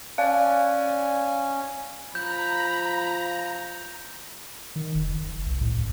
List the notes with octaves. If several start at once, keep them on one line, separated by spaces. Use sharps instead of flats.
C#4 D5 F5 G#5 F#6
F3 A#5 B5 G6
D#3
F1
F#1
C2
A2
D2